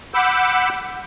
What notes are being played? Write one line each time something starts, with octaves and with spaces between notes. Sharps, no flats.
F#5 B5 D6 E6 G6